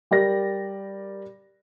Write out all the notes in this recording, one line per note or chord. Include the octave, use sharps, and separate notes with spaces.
G3 G4 A#4 D5 A#6